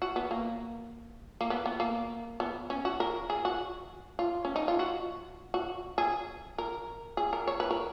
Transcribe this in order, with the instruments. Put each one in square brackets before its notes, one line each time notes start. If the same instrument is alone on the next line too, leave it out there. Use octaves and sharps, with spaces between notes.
[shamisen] F#4
B3
A#3
A#3
B3
B3
A#3
B3
C#4
F#4
A#4
G#4
F#4
F4
C#4
D#4
F4
F#4
F#4
G#4
A#4
G#4
A#4
C#5
B4
A#4